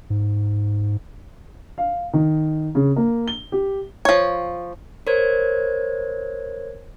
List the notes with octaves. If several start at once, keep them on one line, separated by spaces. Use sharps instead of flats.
G#2
F5
D#3
C#3
A#3
G7
G4
F3 C#5
A#4 C5 C#5 G#6